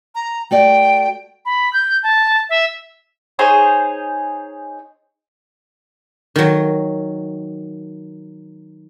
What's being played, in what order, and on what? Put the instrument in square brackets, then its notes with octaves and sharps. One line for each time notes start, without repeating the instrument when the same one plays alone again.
[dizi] A#5
[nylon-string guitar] A3 F#4 D5 [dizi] G5
[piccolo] B5
G6
A5
E5
[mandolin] D#4 G#4 C5 C#5
[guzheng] D#3 F#3